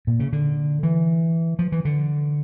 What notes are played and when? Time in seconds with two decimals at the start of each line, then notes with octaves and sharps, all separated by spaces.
0.07 A#2
0.20 C#3
0.33 D3
0.83 E3
1.59 F3
1.72 E3
1.85 D3